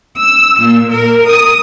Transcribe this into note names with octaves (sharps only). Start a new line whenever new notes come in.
E6
A#2
A#4
D#6